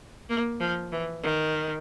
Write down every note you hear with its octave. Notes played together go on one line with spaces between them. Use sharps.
A#3
F3
E3
D#3